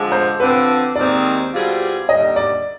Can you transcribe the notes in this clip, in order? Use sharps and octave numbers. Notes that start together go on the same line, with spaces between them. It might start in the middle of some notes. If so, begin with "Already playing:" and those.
Already playing: D3 F3 G#3
C5
D3 F3 C4 B4
D#2 D#3 G#3 C4 D5
B2 G3 C4 F4 G#4
D#2 D3 G3 D#5
D5